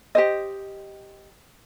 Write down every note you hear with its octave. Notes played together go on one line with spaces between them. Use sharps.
G4 C5 D#5